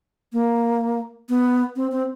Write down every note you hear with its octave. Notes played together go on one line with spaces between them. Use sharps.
A#3
B3
C4
C4